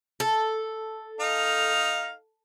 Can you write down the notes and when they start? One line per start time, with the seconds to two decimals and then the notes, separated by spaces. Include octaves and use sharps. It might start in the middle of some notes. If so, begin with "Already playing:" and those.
0.20 A4
1.20 D#4 F5